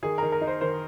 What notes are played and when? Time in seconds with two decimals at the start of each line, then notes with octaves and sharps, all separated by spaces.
0.03 D#3 G#4
0.18 D#3 A#4
0.32 A#4
0.41 D#4
0.47 C5
0.61 D#3 C5